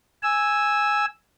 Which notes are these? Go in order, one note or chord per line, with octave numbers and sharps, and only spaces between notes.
G#5 E6